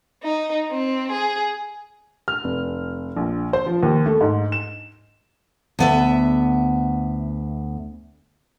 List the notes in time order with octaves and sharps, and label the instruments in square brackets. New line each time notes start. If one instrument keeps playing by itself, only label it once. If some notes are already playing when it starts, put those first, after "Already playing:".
[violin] D#4
C4
G#4
[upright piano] F6
F1
A#1
C5
F3
D#2
A3
G#2
E7
[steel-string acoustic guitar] D2 B3 E5